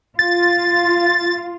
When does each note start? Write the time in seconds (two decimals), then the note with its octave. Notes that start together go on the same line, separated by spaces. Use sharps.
0.19 F4 A6